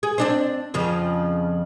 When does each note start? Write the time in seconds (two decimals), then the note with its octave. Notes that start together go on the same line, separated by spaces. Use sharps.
0.03 G#4
0.18 C4 D4 C5
0.74 F2 C#3 F3